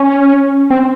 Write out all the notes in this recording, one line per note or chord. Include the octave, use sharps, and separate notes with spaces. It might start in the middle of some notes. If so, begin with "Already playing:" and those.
Already playing: C#4
C4